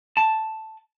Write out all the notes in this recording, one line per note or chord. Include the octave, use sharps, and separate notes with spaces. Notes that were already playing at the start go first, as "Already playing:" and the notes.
A5